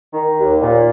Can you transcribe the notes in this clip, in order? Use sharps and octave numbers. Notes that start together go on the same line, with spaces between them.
D#3
D#2
A#2